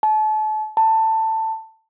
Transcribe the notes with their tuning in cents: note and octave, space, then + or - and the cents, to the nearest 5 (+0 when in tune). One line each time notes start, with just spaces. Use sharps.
A5 -35
A5 +15